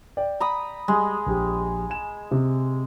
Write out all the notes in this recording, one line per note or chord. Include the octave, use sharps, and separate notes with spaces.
D5 G5
A#5 B5 D#6
G3 G#3
A#1 G4
G#5 E7
C3